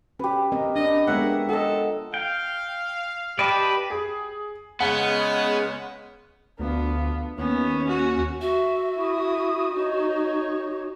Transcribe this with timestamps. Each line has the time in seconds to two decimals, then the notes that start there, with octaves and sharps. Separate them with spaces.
0.19 C#4 G4 B4
0.52 C4 A#4 D#5
0.76 D4 D#5
1.07 G#3 B3 D4 A#4 C#5 E5 F#5
1.49 F4 A4 D#5 F#5
2.14 F5 G5
3.39 G4 B4 D5 D#5 A5
3.90 G#4
4.80 C#3 G#3 B3 F#5
6.59 D2 B3 D4 F4
7.38 D#2 B3 C#4
7.88 F#4
8.41 F#4 E5
8.98 E4 D#6
9.74 D#4 C#5